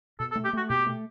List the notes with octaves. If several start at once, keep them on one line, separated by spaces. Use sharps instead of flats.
B2 A4
A4
A3
G4
A3 F#4
B2 G4
A3